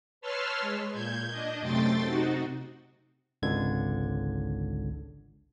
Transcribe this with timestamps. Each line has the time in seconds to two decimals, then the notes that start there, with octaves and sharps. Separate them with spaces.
0.21 B4 C#5 A5 C6 E6 F6
0.60 G#3
0.92 A#2 G6 G#6
1.31 D4 D#5
1.61 F#2 C3 A3 G5 C6 A6
2.04 C3 D#4 F#4
3.42 G#1 C#2 D3 G#6